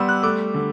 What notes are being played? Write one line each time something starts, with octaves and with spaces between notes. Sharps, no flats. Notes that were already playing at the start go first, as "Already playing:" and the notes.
Already playing: G3 B3 C6 D6 E6
F#6
A3 D6
D3